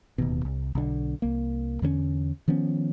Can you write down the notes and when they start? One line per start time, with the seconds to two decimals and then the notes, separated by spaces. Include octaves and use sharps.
0.18 D1 D#2 B2
0.45 C2
0.75 B1 D3
1.22 C2 A#3
1.82 E2 D3 A#3 C#4
2.48 D#3 F3 B3 C#4